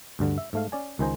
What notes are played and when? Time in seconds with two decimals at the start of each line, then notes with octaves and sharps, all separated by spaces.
0.19 D2 G2 D3
0.38 E5
0.53 G#2 A3 F5
0.72 C#4 D5 G#5
0.99 C#2 D#3 G#4 C5 G#5 A#5